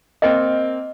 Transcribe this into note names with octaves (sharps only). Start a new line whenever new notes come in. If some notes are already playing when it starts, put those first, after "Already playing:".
A#3 C4 D#5 G5